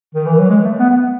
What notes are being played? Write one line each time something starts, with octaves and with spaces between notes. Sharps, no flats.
D#3
E3
F#3
G#3
A3
B3
B3